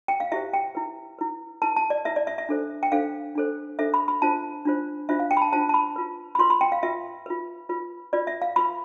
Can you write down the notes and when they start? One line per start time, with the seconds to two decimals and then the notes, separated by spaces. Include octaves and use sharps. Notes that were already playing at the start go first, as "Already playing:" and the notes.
0.08 G5
0.20 F5
0.32 E4 G4 C5 E5
0.54 G5
0.75 E4 B4
1.19 E4 B4
1.62 E4 B4 A5
1.76 A5
1.90 D5
2.05 E4 B4 E5
2.16 D5
2.27 E5
2.38 E5
2.49 D4 A4 C5
2.83 G5
2.92 D4 A4 C5 F5
3.35 D4 A4 C5
3.79 D4 A4 C5 E5
3.94 B5
4.08 B5
4.22 D4 F4 C5 A5
4.65 D4 F4 C5
5.09 D4 F4 C5 E5
5.20 F5
5.31 G5
5.37 B5
5.42 A5
5.52 D4 F4 C5 A5
5.69 A5
5.74 B5
5.96 F4 B4
6.35 B5
6.39 F4 B4 C6
6.50 B5
6.61 G5
6.72 F5
6.83 F4 B4 E5
7.26 F4 B4
7.69 F4 B4
8.13 F4 B4 D5
8.27 E5
8.42 F5
8.56 F4 B4 B5